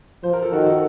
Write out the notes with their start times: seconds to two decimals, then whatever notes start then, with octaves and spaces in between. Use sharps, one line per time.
0.23 F3 C5
0.33 A#4
0.43 A4
0.53 D#3 F#4
0.66 A4